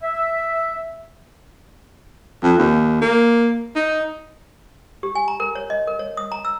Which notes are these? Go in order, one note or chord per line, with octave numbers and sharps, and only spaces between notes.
E5
F2
D#2
A#3
D#4
G4
G#5
A#5
A#4
C#5
D#5
A#4
C#5
D#6
A#5
E6